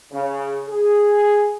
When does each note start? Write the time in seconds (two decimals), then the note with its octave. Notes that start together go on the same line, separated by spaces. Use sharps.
0.12 C#3
0.68 G#4